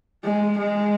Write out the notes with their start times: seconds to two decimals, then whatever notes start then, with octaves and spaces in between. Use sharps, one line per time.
0.24 G#3
0.57 G#3